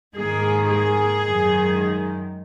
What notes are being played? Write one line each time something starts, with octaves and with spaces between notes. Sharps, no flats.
G#2 D#3 A#3 G#4
G#4
F#2 D#3 G#3